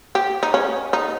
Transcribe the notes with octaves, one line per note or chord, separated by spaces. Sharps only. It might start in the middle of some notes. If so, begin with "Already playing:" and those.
G4
D#4
C#4
D#4